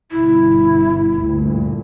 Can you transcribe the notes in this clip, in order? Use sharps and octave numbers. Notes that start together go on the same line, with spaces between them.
G1 B2 E4
D2 G2 A#2